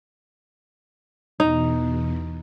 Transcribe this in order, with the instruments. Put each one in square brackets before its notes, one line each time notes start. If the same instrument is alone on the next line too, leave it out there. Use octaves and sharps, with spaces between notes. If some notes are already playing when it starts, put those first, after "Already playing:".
[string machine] E2 B2 [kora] D#4